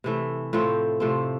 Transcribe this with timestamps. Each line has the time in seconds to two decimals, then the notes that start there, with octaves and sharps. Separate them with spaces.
0.04 C3 E3 A3
0.53 A2 F3 A3 C4
1.00 C3 F3 A3 C4